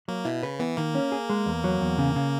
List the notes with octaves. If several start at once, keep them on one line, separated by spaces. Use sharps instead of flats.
F#3 A#3
B2 E4
C#3 B4
E3 B3
D#3 A#3
C#4
G#4
G#3
E2
F#3
E2
C#3
C#3